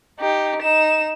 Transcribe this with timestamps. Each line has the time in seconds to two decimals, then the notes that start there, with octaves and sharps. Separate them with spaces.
0.20 D#4 G4
0.62 D#4 E7